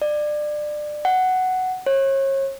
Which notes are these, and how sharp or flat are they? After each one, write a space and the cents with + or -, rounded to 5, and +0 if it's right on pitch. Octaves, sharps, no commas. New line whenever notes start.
D5 +25
F#5 +5
C#5 -35